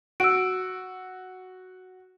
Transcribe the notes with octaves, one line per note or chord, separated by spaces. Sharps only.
F#4 E6 D7